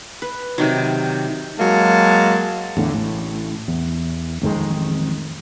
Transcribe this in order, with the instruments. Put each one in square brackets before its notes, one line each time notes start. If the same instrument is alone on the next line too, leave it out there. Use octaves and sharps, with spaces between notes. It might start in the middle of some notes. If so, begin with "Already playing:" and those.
[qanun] B4
C3 D#3 F#3
[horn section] F#3 G#3 A#3 A5
[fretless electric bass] E2 A2 D3
A1 A2
E2
A1 F2 D#3 G#3